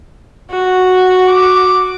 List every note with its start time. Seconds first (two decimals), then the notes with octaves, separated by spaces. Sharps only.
0.51 F#4
1.27 D6